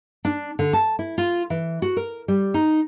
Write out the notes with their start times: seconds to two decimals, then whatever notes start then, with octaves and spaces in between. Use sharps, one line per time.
0.25 D4
0.59 D3
0.73 A5
0.99 E4
1.18 F4
1.50 E3
1.82 F#4
1.97 A#4
2.28 G3
2.54 D#4